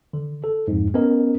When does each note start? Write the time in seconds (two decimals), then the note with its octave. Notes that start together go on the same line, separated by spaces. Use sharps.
0.13 D3
0.44 A4
0.68 F2 G#2
0.94 B3 C#4 A#4 D#5